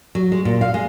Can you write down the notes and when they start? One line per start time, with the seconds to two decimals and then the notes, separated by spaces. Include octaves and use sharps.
0.15 F#3
0.32 G#3
0.45 A#2
0.61 F5
0.74 G#3